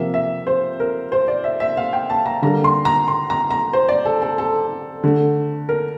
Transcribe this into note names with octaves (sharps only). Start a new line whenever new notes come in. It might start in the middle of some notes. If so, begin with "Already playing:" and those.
Already playing: C3 F3 A#3 E5
E5
C5
A#4
C5
D5
E5
E5
F5
G5
A5
A#5
D3 G3 A#3 A#5
C6
A#5
C6
A#5
A#5
C5
D5
A4
A4
A4
D3 A3
A#4